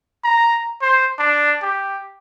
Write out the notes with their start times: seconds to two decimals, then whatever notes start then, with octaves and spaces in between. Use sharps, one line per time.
0.24 A#5
0.82 C5
1.19 D4
1.62 G4